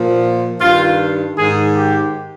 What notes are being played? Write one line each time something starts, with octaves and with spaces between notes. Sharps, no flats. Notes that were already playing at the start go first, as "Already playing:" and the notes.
Already playing: A#2 F3
G2 D#3 F4
G#2 D#3 G#4
G4